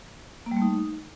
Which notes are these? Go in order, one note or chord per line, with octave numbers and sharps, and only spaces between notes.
A#3
G3
A3
D#4